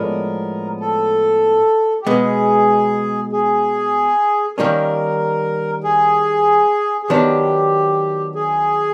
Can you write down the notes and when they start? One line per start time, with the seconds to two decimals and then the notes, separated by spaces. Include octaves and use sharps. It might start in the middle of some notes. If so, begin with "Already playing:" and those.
Already playing: A2 F3 G#3 B3 D4 A#4
0.80 A4
2.02 G4
2.07 B2 G#3 B3 G#4
3.32 G#4
4.58 D#3 G3 A#3 C#4 A#4
5.84 G#4
7.03 G#4
7.09 D#3 F#3 B3 D4 G4
8.35 G#4